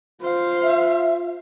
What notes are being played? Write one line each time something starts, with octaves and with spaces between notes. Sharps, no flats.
F4 C5 F5
E5